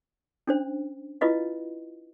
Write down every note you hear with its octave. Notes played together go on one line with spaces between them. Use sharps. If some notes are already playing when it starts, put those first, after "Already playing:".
C#4 D4 C5
E4 F4 B4 D#5 F5